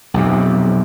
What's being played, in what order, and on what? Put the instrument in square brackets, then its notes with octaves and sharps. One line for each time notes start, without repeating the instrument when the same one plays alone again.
[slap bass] B1 F2 C3